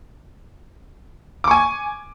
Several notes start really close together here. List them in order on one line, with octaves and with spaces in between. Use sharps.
D6 C#6 G#5